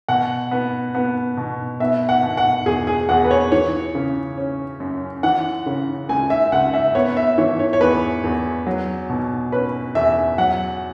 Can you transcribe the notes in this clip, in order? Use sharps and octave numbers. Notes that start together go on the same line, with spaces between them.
B2 F#5
B3
B3
B2
B3 E5
F#5
B2
F#5
E2 G#4
G#4
E2 F#5
B4
C#5
E3 C#5
C#3
C#4
F#2
E3 F#5
C#3
C#2 G#5
E5
C#2 F#5
E5
B3 C#5
E5
E3 C#5
C#5
C#5
E2 B4
E2
F#3
B2
C#4 B4
E2 E5
F#3 F#5